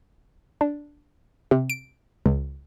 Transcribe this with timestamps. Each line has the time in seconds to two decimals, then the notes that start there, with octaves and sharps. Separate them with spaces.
0.61 D4
1.51 C3
1.70 D7
2.26 C#2